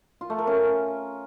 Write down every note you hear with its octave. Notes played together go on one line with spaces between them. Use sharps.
F4
A3
A#4
C#4